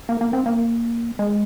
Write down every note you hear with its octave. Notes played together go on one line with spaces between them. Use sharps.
A#3
A#3
C4
A#3
G#3